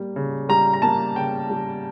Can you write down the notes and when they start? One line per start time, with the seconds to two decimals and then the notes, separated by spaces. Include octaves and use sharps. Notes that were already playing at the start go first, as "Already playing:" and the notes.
Already playing: G3 A#3
0.16 C#3
0.49 G3 A#5
0.73 A#5
0.82 A#3 A5
1.16 C#3 G5
1.50 G3